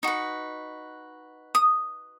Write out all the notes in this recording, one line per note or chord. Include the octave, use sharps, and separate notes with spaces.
D#4 F#4 B4
D#6